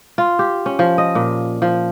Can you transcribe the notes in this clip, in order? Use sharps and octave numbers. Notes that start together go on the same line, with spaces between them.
F4
G4
C#4
F3
D#5
A#2
F3